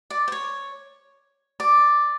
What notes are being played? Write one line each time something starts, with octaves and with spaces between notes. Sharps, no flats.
D5
C5
C#5
D5